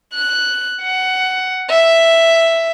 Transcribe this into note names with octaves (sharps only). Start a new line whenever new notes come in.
F#6
F#5
E5